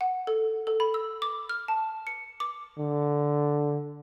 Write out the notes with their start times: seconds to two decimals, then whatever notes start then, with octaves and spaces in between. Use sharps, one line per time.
0.01 F#5
0.27 A4
0.67 A4
0.80 B5
0.94 E6
1.22 D6
1.49 F6
1.68 A5
2.07 C#7
2.40 D6
2.78 D3